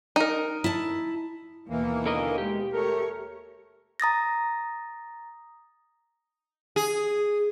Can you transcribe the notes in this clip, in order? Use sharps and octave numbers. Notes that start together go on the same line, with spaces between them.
D#4 A#4
E4 A5
D#2 B2 E3 A#3
D3 A#4 D#5
G#3 G4
A3 A#4 C#5
A#5 D#6 A6 A#6
G#4